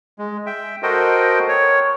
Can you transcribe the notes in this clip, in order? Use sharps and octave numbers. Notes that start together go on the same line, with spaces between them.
G#3
E5 G5
F#4 A4 A#4 C5 D#5 G5
C#5